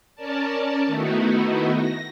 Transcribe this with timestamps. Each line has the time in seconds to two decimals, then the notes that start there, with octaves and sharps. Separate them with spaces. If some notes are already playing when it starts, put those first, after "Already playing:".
0.16 C#4 A#4 D5 A5
0.87 D#3 A3 B3 D#4 E4 F#4
1.76 A#6